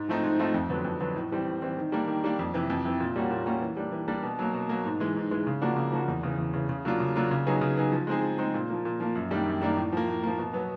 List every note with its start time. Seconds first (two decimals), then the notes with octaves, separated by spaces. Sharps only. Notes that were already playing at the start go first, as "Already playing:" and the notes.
Already playing: G#2
0.09 F3 A3 C4 D#4
0.23 G#2
0.39 F3 A3 C4 D#4
0.54 F2
0.70 D3 F#3 B3
0.85 F2
1.01 D3 F#3 B3
1.16 A2
1.32 E3 G3 C4
1.46 A2
1.62 E3 G3 C4
1.77 D#3
1.92 G3 A#3 D4
2.08 D#3
2.24 G3 A#3 D4
2.39 F2
2.54 C3 E3
2.70 F2
2.85 C3 E3
3.00 A#2
3.16 G3 A#3 C#4 F#4
3.31 A#2
3.46 G3 A#3 C#4 F#4
3.62 E3
3.77 G3 A#3 D4
3.92 E3
4.08 G3 A#3 D4
4.23 B2
4.39 F#3 A#3
4.54 B2
4.69 F#3 A#3
4.85 G#2
5.00 E3 G#3
5.16 G#2
5.31 E3 G#3
5.47 C#3
5.62 F3 A#3 D4 F#4
5.77 C#3
5.92 F3 A#3 D4 F#4
6.08 E2
6.23 C#3 E3
6.39 E2
6.54 C#3 E3
6.69 C#3
6.85 F#3 A#3 D4 F4
7.00 C#3
7.16 F#3 A#3 D4 F4
7.31 C#3
7.46 F#3 B3 D#4 G#4
7.61 C#3
7.77 F#3 B3 D#4 G#4
7.92 F3
8.07 G#3 C4 D#4 G#4
8.23 F3
8.38 G#3 C4 D#4 G#4
8.54 A#2
8.70 F3 A#3
8.85 A#2
9.00 F3 A#3
9.15 F#2
9.31 D#3 G3 A#3 D4
9.46 F#2
9.61 D#3 G3 A#3 D4
9.77 A2
9.92 F3 A#3
10.07 A2
10.23 F3 A#3
10.38 B2
10.53 F#3 B3